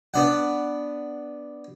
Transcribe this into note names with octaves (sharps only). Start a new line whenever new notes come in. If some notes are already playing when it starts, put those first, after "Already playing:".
B3 D4 F#5